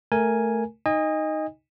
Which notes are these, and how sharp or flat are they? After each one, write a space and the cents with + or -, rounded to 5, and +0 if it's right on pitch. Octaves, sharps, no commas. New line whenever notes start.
A3 +0 A#4 +0 G#5 +0
D#4 +0 D#5 +0 G#5 -35